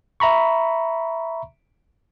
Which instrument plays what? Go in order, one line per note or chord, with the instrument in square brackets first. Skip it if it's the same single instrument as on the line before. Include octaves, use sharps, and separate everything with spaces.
[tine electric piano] E5 A#5 B5 C#6